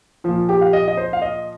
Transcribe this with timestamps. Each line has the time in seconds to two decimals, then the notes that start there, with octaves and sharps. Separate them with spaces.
0.24 A#2 F3 F4
0.49 G4
0.61 F5
0.73 D#5
0.88 D#5
0.97 C5
1.13 F5
1.22 D#5